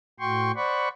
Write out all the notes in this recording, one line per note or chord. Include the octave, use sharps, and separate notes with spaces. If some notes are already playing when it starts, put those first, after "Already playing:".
A2 F#4 G5 C6 C#6
C5 D5 F#5 B5 C#6